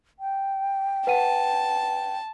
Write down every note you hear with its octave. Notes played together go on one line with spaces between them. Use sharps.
G5
B4 F#5 A5 D#7